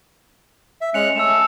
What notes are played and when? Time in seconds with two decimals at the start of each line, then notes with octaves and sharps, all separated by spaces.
0.81 E5
0.94 G#3 C#4 F#6 C#7 F7
1.16 A3 C#4 E6 E7
1.29 A5